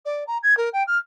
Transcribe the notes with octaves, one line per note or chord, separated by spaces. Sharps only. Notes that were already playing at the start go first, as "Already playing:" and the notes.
D5
A#5
G#6
A#4
G5
F6